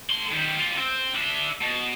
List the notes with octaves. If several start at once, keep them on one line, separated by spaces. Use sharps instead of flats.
A2 C6
D#3 G3
F4 G4
C4
D4 E5
B2